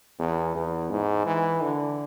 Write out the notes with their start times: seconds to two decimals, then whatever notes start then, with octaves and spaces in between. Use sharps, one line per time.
0.19 E2
0.56 E2
0.90 G#2
1.26 E3
1.62 D3